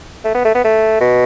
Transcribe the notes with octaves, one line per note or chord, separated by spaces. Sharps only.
A3
B3
A3
B3
A3
B2